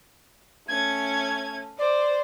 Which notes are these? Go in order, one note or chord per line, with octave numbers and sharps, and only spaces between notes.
A3 C#4 G#6
C5 D5